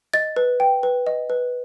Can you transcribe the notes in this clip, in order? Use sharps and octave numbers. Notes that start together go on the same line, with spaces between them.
D#5 A6
B4
G5
B4
D#5
B4